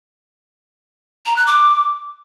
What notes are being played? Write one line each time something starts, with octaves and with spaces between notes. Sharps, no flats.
A#5
F#6
D6